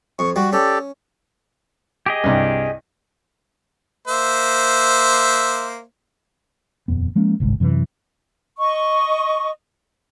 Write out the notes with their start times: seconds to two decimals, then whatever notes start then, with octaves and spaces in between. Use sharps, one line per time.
0.19 F2 C#6
0.36 G3 F#4
0.53 C#4 G4 A4 D5
2.06 G4 G#4 D#5
2.24 C2 G2
4.08 A#3 C5 E5
6.88 D#1 F2 B3
7.15 F3 G#3 A#3 C#4
7.40 G1 C2 G#2
7.60 F#2 C3 D#3 E3
8.59 D#5 C#6